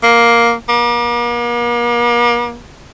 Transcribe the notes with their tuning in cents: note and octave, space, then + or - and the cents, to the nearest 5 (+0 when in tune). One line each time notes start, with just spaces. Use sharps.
A#3 +5
A#3 +40